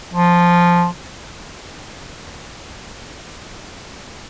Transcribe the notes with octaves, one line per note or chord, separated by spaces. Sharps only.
F3